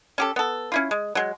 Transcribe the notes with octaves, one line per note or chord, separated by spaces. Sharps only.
C#4 G4 A4
B3 A4
C#4 E4 F4
G#3
F#3 G#3